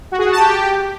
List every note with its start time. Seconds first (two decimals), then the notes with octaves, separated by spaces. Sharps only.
0.12 F#4
0.18 G#4
0.25 F#4
0.32 A5
0.39 G4